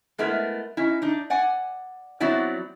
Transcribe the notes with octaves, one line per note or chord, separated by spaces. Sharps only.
G#3 A3 B3 E4 A#4
C#4 D#4 E4
D4 D#4
D5 F#5 G#5
F#3 B3 C4 E4 D5